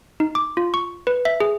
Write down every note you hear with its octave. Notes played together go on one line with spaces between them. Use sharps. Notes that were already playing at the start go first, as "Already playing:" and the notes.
D#4
D6
F4
C#6
B4
E5
G#4